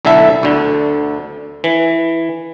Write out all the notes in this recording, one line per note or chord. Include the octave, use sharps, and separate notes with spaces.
B1 D3 E4 A4 E5
D2 D3
E3